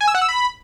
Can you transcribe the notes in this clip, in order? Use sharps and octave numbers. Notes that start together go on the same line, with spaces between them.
G#5
E6
F#5
E6
B5